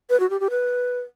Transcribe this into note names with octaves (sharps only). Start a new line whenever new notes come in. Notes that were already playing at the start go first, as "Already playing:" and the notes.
B4
F#4
G4
G4
B4